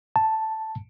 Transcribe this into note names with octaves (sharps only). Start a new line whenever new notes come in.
A5